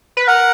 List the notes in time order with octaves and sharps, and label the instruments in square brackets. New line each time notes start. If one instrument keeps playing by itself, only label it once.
[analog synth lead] B4
[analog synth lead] A#4 [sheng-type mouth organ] F#5